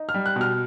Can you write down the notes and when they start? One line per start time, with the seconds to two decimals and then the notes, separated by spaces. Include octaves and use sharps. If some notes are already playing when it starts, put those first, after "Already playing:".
Already playing: D#4
0.09 F6
0.14 G3
0.26 F#6
0.36 B2
0.41 F6